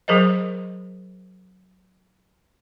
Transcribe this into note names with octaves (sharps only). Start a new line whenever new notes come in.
F#3 G#4 A#4 C5 D#5